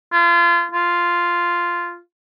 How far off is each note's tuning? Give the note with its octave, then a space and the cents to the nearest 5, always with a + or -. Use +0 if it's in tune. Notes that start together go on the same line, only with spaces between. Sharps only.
F4 -30
F4 -5